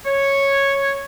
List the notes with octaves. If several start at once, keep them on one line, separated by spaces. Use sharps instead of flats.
C#5